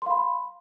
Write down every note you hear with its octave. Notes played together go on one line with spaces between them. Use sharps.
F5 B5 C6